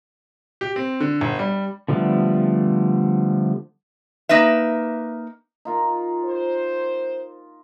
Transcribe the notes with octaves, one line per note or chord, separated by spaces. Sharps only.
G4
C4
D3
G1
G3
D3 F3 G3 A3 B3
A#3 D#4 B4 E5
D#4 F4 A#4
C5